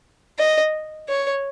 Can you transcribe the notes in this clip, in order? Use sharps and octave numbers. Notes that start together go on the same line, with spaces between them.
D#5
C#5